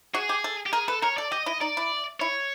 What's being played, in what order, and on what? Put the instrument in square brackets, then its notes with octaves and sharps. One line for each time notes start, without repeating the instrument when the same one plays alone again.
[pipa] F#4 [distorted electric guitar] G#4
[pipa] G4
A4
[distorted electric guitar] G4
[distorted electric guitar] G#4 [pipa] A#4
[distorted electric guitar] A4 [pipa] B4
[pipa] A#4 [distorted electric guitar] C#5
[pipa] A4 [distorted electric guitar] D5
[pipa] G4 [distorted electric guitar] D#5
[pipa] E4 [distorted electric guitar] D#5
[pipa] D#4 [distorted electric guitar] D5
[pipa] E4
[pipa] E4 [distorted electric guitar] C#5